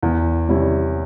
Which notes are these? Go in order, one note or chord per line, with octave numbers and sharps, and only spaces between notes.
E2
C3 G3 C#4 E4